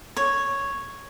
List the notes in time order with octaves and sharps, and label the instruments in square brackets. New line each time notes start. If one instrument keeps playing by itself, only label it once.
[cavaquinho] C#5